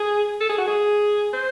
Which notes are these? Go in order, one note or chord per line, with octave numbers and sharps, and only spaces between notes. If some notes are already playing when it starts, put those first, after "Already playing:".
Already playing: G#4
A4
G#4
F#4
G#4
C5